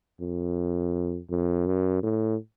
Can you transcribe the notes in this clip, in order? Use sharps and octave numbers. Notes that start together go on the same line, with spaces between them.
F2
F2
F#2
A2